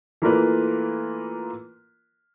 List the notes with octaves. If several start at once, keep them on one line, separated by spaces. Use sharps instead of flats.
E3 A3 A#3 F4 A#4 B4